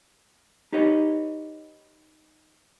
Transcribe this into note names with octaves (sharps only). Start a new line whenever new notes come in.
D#4 G4 B4 C#5 D#5